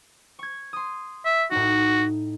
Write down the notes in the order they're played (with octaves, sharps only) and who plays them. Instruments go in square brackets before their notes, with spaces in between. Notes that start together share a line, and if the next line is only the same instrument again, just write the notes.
[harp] C#6 G#6
C6 D#6
[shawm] E5
[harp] A2 D#4 [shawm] F#4